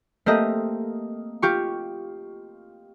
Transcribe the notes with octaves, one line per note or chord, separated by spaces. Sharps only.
A3 A#3 C4 G4 D#5
F4 G4 C#6